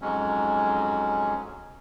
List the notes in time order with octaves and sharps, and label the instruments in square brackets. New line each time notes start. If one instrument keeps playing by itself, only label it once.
[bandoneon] F2 G#2 F#3 G#3 C#4